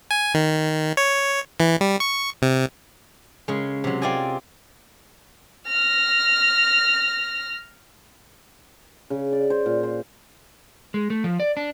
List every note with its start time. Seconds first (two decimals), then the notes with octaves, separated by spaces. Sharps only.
0.11 G#5
0.34 D#3
0.97 C#5
1.60 E3
1.81 G3
2.00 C#6
2.42 C3
3.48 C#3 G#3
3.84 C3 F#3
4.02 C4 F4 D5 D#5 G#5
5.67 F6 A#6
9.10 C#3
9.32 D5
9.50 C5
9.66 A#2
9.83 C5
10.94 G#3
11.10 A3
11.24 F3
11.40 D5
11.57 D4